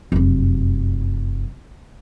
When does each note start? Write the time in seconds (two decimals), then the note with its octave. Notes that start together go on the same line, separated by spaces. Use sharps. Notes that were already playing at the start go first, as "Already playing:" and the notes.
0.12 F1 F#2